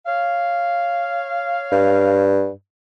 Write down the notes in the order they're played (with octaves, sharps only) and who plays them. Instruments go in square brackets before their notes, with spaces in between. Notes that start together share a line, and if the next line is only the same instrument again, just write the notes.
[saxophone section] C#5 F5
[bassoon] G2